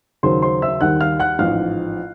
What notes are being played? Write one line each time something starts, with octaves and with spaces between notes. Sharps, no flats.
D#2 C#3 F#3 C5 C6
C5 C6
E5 E6
D#2 D#3 G3 F#5 F#6
F5 F6
F#5 F#6
A1 G#2 F3 F5 F6